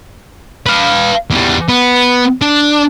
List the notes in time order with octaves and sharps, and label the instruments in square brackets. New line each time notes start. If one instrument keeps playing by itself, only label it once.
[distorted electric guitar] B4 F5
E2 G3
B3
D4